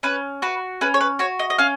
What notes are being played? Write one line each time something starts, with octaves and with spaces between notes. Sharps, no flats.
C#4 B4
F#4 B4
C#4 B4
C#5
B4
F#4 C#5
D#5
D#5
C#4 F5